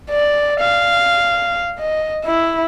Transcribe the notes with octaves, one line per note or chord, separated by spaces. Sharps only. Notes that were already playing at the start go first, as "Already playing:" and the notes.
D5
F5
D#5
E4